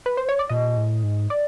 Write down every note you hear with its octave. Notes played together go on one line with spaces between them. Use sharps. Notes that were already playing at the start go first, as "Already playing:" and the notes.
B4
C5
C#5
D5
A#2 D#5
A2
G#2
D5